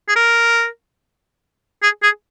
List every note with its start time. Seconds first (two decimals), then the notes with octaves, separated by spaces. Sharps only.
0.08 G#4
0.16 A#4
1.83 G#4
2.03 G#4